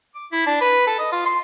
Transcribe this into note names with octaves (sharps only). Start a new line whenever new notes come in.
D6
E4
D4
B4
A4
D#5
F4
C6